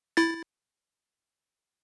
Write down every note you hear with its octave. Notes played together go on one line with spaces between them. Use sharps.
E4 A6